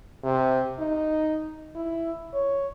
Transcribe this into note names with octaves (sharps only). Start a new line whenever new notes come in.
C3
D#4
E4
C#5